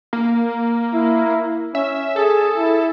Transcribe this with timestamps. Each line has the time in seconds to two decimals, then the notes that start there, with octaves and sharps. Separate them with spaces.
0.13 A#3
0.94 E4
1.75 C#4 E5
2.16 G#4 A4
2.58 E4